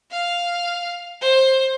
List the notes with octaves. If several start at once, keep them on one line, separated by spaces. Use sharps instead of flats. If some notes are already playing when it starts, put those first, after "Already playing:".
F5
C5